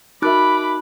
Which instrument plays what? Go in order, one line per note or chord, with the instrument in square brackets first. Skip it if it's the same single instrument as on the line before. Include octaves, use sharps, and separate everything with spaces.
[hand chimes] D#4 F#6 [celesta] F#4 A#4 E5 [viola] B5 [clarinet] D6